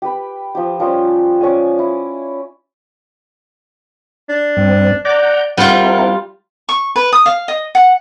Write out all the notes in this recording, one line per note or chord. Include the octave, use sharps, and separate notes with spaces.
G4 B4 B5
F3 G4
F3 G3 C#4 C6
C#4 C#5 D5 G#5
E4
D4
G2 C4
D5 F#5 A#5 G6
G3 C4 E4 F4 A#4 F#5
C#6
B4
D#6
F5
D#5
F#5